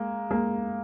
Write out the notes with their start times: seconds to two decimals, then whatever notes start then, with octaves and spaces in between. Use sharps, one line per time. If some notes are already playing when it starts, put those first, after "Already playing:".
Already playing: G#3 A#3
0.31 G#3 A#3